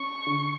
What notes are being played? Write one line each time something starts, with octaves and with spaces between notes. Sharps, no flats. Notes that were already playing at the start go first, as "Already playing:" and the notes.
Already playing: C#4 C#6
D3